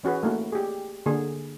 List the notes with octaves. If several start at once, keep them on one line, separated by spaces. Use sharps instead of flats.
E3 C#4 F#4 G#4 B4
A3 A#3 D#4 F#4
G4 G#4
D3 A#3 G#4